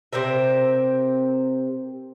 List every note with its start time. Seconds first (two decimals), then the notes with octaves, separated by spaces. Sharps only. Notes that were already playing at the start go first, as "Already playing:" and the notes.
0.13 C3 C4 A#4 E5